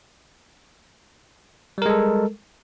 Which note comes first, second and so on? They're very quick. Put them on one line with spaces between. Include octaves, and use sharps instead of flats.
G3 A#4 G#3 A4